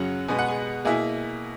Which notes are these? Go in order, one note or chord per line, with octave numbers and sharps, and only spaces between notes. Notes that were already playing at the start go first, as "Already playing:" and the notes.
Already playing: F#2 C#3 F#3 C#4 F#4 F#5
B2 G#3 B3 G#5
F#5
G#4 G#5
B2 A#3 E4 G#4 G#5